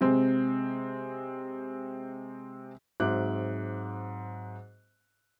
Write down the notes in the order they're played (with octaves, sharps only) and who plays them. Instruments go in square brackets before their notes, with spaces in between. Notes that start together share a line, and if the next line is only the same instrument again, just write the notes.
[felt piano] C3 G#3 C4
G#2 F#3 C4 E5 D6 F#6